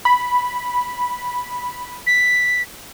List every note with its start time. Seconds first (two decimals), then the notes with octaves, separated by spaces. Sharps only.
0.05 B5
2.07 B6